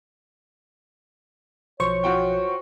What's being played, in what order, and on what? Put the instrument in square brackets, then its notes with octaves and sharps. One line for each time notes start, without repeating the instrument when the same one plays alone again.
[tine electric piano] B1 F3 F#3 [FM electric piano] C5 C#6 [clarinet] C#5
[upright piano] F4 F#4 G5